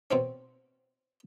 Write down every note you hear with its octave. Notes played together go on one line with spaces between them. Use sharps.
B2 C4 C#4